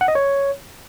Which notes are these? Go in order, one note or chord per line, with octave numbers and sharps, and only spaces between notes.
F#5
D#5
C#5